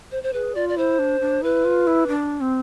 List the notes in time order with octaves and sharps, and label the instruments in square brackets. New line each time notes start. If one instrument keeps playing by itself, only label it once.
[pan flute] C5
C5
[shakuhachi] G#4 [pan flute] B4
[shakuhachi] F4 [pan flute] D5
[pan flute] D5
[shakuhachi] E4 [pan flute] C5
[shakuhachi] D4
D4
[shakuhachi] E4 [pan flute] B4
[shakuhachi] F4
E4
D4
C4